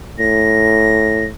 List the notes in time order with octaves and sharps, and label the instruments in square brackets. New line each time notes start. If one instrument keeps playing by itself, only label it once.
[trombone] A2 [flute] A#6